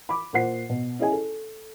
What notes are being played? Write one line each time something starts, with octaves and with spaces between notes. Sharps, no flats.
B5 D6
A#2 C5 F#5 C7
B2
C#4 E4 G#4 D#5 G#5
A4